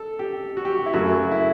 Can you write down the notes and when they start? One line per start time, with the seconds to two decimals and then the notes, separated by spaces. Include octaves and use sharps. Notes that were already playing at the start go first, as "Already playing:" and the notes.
Already playing: A4
0.19 G4
0.57 F#4
0.65 G4
0.75 F#4
0.86 E4
0.93 F#2 C#3 F#3 A3 F#4
1.31 E4